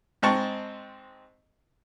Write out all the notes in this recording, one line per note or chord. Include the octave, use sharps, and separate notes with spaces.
G#2 G#3 C4 A5 C#6